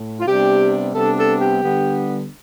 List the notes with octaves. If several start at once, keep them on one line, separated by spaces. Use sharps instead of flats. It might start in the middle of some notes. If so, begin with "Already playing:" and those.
Already playing: A2
F4
C3 G3 B3 D4 G4
C3 G3 B3 D4 A4
A4
G4
D3 G3 B3 D4